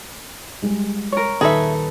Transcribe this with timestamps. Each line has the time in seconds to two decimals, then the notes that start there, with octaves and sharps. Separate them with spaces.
0.62 G3 G#3
1.12 A#4 C#5
1.41 D#1 D#4 G#4 A4 B4 E5